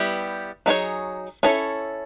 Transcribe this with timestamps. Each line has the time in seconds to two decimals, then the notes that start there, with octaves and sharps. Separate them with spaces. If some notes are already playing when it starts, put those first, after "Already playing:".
Already playing: G3 B3 E4 G4
0.66 F#3 B3 D#4 G#4 C#5
1.43 C#4 E4 A4 C#5